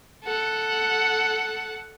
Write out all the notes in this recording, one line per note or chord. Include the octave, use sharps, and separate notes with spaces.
A4 F#5